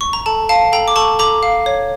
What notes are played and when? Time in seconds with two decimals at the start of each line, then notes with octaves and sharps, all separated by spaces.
0.01 C#6
0.13 A#5
0.26 A4 A5
0.49 F5 A5
0.73 A4 G5 A#5
0.88 D6
0.96 A4 A5 C#6
1.19 A4 A#5 D6
1.43 F5
1.66 C#5